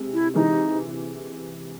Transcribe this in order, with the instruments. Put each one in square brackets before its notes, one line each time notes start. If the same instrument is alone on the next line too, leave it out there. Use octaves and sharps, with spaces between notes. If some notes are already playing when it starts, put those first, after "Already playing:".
Already playing: [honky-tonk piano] C3 G#3
[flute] E4
[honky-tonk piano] C3 E3 G#3 [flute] D#4